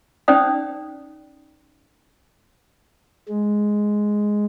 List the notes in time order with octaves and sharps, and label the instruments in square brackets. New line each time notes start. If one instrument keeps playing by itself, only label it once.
[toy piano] C#4 D#4 C5 D5 G5 D#6
[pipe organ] G#3